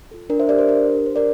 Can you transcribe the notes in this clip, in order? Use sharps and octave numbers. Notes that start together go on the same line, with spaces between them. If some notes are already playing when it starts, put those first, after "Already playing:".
F4 A4
D4 A#4 D5
C5 E5
G4 A#4 D5
C5
D4 A#4
G4
D4 C5
A#4 D5